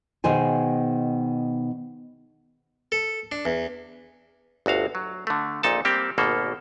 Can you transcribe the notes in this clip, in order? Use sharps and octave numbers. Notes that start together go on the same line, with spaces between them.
B2 D#3 G#4 C5 G#5
A4
D4
E2
G1 D2 F#4 F5
F#3
D3 A3
A#1 A#2 D#4 A4 A5
G3 A#3 C4 G4
G#1 B2 A#3 A4